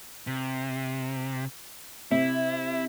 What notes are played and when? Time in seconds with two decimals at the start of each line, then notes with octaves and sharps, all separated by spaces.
0.27 C3
2.11 C3 E4